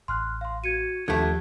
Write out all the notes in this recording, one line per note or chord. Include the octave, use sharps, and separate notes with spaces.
A1 C6 F6 F#6
F5 C6
F#4 G#6 C#7 D#7
D#2 D3 F3 A3 G4 G6 G#6